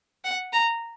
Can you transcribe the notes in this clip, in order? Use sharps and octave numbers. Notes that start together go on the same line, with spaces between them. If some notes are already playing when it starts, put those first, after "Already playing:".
F#5
A#5